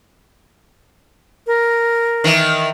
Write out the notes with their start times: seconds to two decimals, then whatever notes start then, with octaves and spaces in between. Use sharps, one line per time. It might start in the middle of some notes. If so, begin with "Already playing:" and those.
1.47 A#4
2.24 D#3 E3 E4